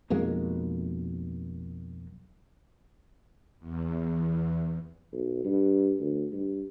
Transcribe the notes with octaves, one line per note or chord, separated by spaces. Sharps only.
B1 F2 G#3 A#3
E2
B1
G2
D2
G2